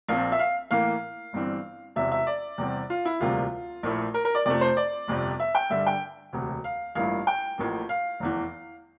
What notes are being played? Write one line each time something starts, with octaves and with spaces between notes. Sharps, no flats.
A#1 A#2 F3 C4 F5
E5
F5
A2 E3 A#3 F5
G1 G2 E3 G3 C4
E1 E2 C3 E5
E5
D5
E2 C3 G3 C4
F4
E4
E1 D2 C3 G3 A#3 F4
A#1 A#2 A3 E4
A#4
A#4
D5
F2 C3 F3 A3 D5
C5
D5
G1 F2 C3 G3
E5
G5
G2 D3 G3 E5
G5
E1 D2 C3
F5
A1 G2 F3 A#3 E4 F5
G5
A1 A2 F3 A#3
F5
F1 E2 E3